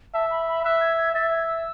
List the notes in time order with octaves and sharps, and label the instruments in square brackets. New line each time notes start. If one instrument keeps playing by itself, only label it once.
[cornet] E5 [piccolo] A5
[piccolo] B5
B5
[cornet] E5 [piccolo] F#6
[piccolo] G#6
G#6
[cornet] E5 [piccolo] A6
[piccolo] G#6
E6